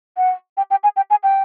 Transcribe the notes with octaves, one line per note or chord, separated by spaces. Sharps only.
F#5
G5
G5
G#5
G5
G#5
G5